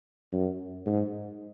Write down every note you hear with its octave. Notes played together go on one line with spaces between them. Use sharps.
F#2
G#2